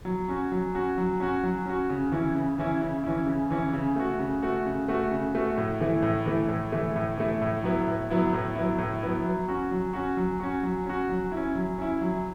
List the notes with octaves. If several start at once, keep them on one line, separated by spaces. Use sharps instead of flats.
F#3
C#4 F#4
F#3
C#4 F#4
F#3
C#4 F#4
F#3
C#4 F#4
C#3
E3 C#4 E4
C#3
E3 C#4 E4
C#3
E3 C#4 E4
C#3
E3 C#4 E4
C#3
A3 F#4
C#3
A3 F#4
C#3
A3 F#4
C#3
A3 F#4
A2
E3 A3 E4
A2
E3 A3 E4
A2
E3 A3 E4
A2
E3 A3 E4
A2
F#3 B3 E4
A2
F#3 B3 E4
A2
F#3 B3 E4
A2
F#3 B3 E4
F#3
C#4 F#4
F#3
C#4 F#4
F#3
C#4 F#4
F#3
C#4 F#4
F#3
C#4 E4
F#3
C#4 E4
F#3